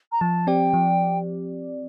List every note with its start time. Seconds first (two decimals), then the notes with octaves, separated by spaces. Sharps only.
0.12 A#5
0.21 F3 A5
0.47 C4 G4 D5 G5
0.73 F3